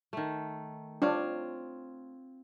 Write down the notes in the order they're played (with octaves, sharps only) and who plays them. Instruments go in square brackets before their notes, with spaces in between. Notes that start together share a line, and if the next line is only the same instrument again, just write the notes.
[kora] D#3 A3
[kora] C4 F4 C#5 [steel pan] D4